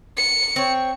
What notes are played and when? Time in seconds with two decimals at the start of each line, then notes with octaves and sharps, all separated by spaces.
0.17 C#7
0.56 C4 C#5